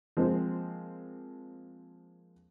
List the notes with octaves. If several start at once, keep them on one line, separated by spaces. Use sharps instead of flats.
F3 G#3 A#3 C4